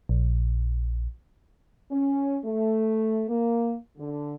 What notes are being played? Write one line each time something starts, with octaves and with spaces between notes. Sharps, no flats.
A#1
C#4
A3
A#3
D3